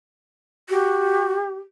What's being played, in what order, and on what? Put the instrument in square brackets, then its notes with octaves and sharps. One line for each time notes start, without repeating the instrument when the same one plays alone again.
[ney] F#4 [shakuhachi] G4